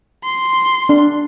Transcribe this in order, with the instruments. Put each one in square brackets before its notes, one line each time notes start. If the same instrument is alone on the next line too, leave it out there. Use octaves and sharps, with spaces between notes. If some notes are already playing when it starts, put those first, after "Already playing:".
[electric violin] C6
[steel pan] D4